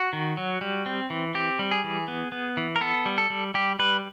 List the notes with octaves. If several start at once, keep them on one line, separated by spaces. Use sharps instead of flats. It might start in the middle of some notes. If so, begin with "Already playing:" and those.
Already playing: F#4
D#3
F#3
G3
C4
E3
C4 G4
G3
G#4
E3
B3
B3
E3
A#4
B3 A4
G3
A4
G3
G3 G4
G3 B4